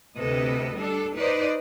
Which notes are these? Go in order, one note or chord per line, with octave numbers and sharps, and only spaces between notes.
D2 C3 A4 B4 D#5
G3 D4 A4
D#4 B4 C5 D5 D#5